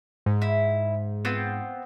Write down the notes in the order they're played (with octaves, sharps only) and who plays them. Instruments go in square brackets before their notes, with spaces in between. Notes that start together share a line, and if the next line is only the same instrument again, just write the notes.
[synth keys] G#2
[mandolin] E4
B3 C4 F4